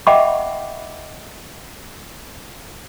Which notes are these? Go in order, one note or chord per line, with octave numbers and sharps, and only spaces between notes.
D#5 E5 F#5 G5 B5 D6